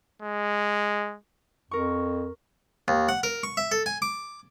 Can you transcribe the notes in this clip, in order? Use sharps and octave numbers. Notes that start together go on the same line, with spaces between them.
G#3
F2 A#4 C#6
D#2
F#5
A#4
C#6
E5
A4
G#5
D6